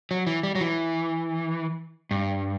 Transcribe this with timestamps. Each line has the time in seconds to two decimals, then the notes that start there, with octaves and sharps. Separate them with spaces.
0.11 F#3
0.27 E3
0.43 G3
0.55 F#3
0.61 E3
2.11 G2